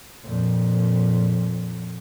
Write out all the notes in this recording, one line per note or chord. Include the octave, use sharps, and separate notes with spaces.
F2 A#2